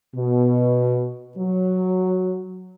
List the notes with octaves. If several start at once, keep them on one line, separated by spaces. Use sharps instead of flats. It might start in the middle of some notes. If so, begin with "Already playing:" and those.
B2
F#3